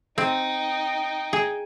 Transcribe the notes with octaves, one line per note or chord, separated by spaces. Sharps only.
C4 D#4 G5
G#4